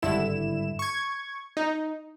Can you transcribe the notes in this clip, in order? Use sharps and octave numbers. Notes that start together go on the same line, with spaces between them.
G#1 G2 D3 E4 E7
C#6 G#6
D#4